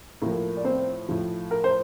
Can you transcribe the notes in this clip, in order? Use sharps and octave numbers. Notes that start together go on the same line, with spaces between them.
A2 F3 A#3 A#4
D5
C4 C5
A2 F3
A#4
C5